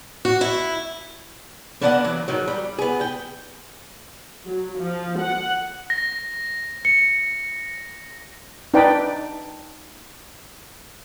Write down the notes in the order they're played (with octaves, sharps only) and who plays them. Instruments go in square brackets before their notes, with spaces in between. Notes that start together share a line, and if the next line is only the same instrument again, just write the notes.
[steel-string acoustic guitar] F#4
E4
[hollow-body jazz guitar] A#3 B3 D4 D5 D#5 F#5
E3 F#3
G#2 D#3 F#3
G3
B3 G#4
G5
[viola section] F#3
F3
F#5
[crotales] A#6
[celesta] C#7
[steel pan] D4 D#4 B4 D5 G5